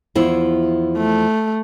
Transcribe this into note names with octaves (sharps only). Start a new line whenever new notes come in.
E2 F3 E4
A3